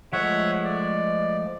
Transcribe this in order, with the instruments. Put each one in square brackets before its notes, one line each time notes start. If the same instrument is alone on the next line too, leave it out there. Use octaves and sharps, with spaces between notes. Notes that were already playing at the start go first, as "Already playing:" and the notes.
[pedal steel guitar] F3 G#3 A3 [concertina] C#5 E5 F#5
[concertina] D5